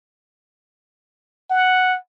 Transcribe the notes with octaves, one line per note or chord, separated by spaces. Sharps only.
F#5